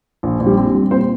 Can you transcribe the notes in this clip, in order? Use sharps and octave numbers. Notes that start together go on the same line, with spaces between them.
A#1
A#1
G3 G4
C4
G3
A#2 C4 C5